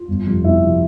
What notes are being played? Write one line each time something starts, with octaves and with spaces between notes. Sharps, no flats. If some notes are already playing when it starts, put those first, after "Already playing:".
Already playing: F4
G1
F2 C3 F3
G1 E4
C3 F3